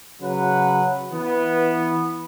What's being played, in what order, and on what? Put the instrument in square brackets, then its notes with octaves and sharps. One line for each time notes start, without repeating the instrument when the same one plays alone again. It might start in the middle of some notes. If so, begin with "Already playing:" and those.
[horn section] C#3 F#3 B4 F#5
E3 B3